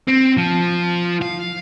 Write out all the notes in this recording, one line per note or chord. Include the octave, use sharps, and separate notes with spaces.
C4
F3
F5